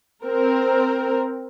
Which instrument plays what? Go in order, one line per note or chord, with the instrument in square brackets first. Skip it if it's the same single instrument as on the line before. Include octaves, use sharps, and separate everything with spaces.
[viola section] C4 A#4